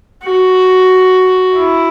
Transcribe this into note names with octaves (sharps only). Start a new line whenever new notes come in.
F#4
E4